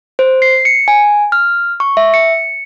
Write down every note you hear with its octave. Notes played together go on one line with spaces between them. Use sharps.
C5
C7
C#7
G#5
F6
C#6
E5
C#7